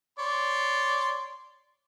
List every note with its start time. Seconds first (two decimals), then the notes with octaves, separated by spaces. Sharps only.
0.19 C#5 D5 C6